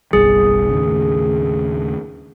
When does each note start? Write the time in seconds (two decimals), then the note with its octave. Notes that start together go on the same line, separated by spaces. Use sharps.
0.13 F#1 B1 G3 G#4
0.69 D#2 A2 C#3